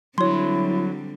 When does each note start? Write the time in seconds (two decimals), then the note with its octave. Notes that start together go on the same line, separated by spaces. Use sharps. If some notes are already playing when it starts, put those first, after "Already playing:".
0.18 D3 F#3 G3 C4 E4 C#5 C6